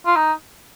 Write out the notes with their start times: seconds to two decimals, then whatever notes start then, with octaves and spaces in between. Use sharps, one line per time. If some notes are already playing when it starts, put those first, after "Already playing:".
0.06 F4
0.16 D#4